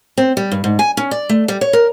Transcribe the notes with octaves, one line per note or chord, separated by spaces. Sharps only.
C4
G3
G2
G#2
G#5
C#4
D5
A3
G3
C#5
A#4